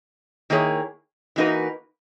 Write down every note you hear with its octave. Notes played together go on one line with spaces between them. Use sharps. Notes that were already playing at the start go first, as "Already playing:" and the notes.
D#3 A#3 E4 G#4 C#5
E3 A#3 D#4 F#4 B4